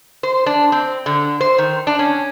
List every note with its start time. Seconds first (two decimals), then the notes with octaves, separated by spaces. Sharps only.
0.23 C5
0.46 D4
0.72 C4
1.06 D3
1.41 C5
1.58 D#3
1.87 D4
1.99 C#4